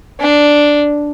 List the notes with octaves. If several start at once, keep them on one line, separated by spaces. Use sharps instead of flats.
D4